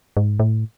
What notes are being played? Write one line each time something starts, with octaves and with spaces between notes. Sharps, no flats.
G#2
A2